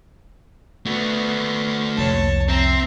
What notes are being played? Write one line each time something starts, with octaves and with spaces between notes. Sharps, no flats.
A3 B3 F#4
C2 F2 C#5 A5
C4 E5 A#5